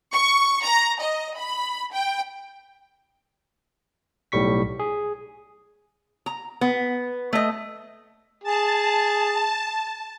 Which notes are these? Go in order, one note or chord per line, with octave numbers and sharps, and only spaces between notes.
C#6
A#5
D#5
B5
G5
B1 A2 G3 C#6 B6
G#4
A#5
B3
A3 D#5
G#4 A5